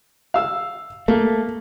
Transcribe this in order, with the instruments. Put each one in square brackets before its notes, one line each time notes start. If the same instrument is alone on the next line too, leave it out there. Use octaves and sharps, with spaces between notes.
[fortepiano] F5 E6
[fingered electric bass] A3 [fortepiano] A#3